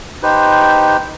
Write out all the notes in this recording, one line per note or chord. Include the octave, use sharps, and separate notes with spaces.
D#4 G4 B4 C5